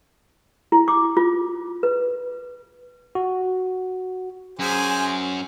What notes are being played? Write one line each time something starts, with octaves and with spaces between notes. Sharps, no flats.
E4
D6
F4
B4
F#4
F#2 G#4 C5 G#5